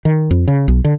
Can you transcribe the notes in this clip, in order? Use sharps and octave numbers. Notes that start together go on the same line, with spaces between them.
D#3
F2
C#3
B1
D3